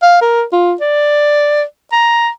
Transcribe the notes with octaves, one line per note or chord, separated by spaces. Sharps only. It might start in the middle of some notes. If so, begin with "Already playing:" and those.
F5
A#4
F4
D5
A#5